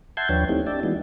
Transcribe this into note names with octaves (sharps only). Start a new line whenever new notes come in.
E5 F#5 A5 C6 G6 G#6
D#2 F3 D4 B4 C#5 G5
A3 C4 D#4 E4 G4
D4 D5 E5 G5 A5
E3 G#3 B3 D#4 E4 F#4